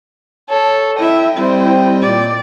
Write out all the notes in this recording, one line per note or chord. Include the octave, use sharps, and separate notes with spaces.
A4 C#5
E4 D#5 E5 G5
G3 C4 E4 C5
A#2 D5